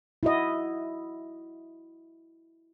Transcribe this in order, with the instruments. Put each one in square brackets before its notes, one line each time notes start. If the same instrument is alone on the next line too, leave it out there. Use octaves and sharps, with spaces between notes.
[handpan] E4 F#4 D#5